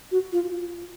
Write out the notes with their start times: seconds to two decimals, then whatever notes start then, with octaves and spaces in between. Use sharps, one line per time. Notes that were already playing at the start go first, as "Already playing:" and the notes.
0.11 F#4
0.32 F4